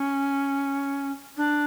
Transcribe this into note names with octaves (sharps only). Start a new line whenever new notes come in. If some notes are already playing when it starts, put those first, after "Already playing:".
Already playing: C#4
D4